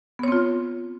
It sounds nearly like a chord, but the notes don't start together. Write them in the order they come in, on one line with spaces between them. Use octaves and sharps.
B3 C#5 C4 F4